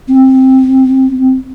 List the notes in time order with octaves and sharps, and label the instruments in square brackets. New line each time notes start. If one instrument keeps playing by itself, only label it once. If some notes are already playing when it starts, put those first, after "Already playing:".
[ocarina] C4